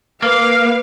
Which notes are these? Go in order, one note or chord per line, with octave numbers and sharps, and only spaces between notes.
A#3 B4 F5